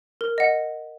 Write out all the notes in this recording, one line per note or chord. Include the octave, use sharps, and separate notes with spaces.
A#4
D#5 F#5